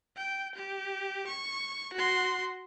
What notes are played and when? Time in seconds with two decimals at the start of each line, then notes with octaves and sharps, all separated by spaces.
0.17 G5
0.55 G4
1.27 C#6
1.94 F#4 C6